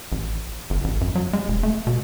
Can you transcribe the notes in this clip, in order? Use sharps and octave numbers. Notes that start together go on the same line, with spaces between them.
A1
G1
A1
F#2
F#3
G#3
E1
A3
B2